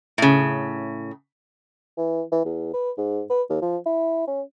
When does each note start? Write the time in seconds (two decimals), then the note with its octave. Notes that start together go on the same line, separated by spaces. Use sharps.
0.18 A2 C#3
1.97 E3
2.31 E3
2.45 E2
2.73 B4
2.97 G#2
3.30 B4
3.49 D#2
3.61 F3
3.86 E4
4.27 C#4